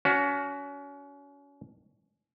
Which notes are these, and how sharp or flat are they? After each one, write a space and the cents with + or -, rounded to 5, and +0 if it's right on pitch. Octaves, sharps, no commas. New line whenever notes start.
C#4 +30 F#4 +5